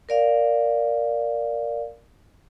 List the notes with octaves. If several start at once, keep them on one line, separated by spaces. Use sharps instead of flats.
A#4 D5 F5